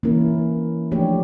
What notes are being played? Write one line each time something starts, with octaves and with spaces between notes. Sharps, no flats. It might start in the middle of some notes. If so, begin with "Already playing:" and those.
E3 A#3 C#4 E4 A#4
F3 A3 D4 G4 C#5